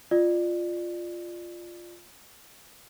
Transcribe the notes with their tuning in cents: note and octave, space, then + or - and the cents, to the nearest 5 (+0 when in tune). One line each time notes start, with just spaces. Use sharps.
F4 +0 D5 +30